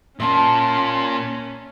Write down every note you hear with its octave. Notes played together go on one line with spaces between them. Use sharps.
A#2 A#3 C#4 E5 A5 C6